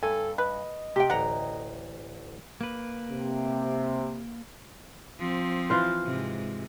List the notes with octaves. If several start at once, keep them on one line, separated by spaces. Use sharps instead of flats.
G2 A4 G#5
B4 D#5
C3 G4 G5
A1 D2 F#5 A#5
A#3 B4
C3
F3 C4
E3 F4 C5
G#2 C3 G#3